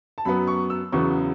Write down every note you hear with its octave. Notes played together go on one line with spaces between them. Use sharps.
A5
F#2 F#3 B3 B5
C#6
E6
E2 C#3 F#3 B3 C#6